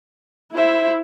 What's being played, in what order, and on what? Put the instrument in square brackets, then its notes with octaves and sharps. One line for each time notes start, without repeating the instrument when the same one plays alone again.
[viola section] E4 [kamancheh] C5 E5